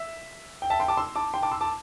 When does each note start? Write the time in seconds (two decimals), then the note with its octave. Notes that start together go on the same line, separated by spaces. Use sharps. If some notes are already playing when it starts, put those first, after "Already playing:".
Already playing: E5
0.62 G5
0.70 E5 A5
0.80 G5 C6
0.88 A5 D6
0.97 C6 E6
1.16 A5 D6
1.34 G5 C6
1.42 A5 D6
1.51 C6 E6
1.61 A5 D6